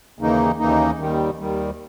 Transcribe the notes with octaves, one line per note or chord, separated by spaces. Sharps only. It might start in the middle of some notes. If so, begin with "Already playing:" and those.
D#2 C#3 E3 A#3 D#4
D#2 C#3 E3 A#3 D#4
D#2 D#3 G3
D#2 D#3 G3